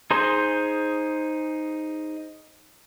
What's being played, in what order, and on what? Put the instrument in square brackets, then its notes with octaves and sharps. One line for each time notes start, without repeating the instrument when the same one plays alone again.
[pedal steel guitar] D#4 G#4 C5 C6